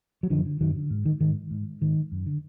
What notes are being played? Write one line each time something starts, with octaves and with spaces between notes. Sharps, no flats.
F#3
F#2 D3 F3
D3
F#2 D#3 F#3
D3
G#2
D#3
G#2 D#3
G#2
G#2 D#3
F#2
D3